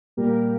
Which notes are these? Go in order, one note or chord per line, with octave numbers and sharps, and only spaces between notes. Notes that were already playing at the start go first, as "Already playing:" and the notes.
A#2 G3 A#3 G4 A#4